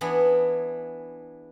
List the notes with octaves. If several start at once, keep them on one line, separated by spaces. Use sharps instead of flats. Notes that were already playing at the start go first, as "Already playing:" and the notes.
E3 B3 D4 G#4